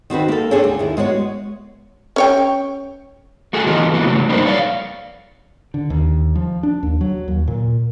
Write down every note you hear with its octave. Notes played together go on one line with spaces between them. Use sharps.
D#3 C4 F#4 B4
A#3 A4
C4 D4 F4 G#4 A4 C#5
D2
D#2 E4
G#3 B3 F#4 C#5
C#4 C#5 G5
A3 F#4 G#4 A4
E3 F#3 G#3 B3 F4 D#5
E3 A#3 B3 E4 F#4
C#3 F#3 A3
F3 G3 A#3 D#4 B4 C5
C#5 D5 F5
D3
D#2
F3
D4
D#2
F#3
D#2
A#2